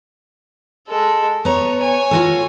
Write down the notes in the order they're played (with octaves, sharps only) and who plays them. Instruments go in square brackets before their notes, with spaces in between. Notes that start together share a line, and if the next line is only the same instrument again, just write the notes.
[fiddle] G#3 A4
[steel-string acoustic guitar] B3 A#5 [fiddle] C#5
[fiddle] C#5 G#5
[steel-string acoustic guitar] F4 F#4 A4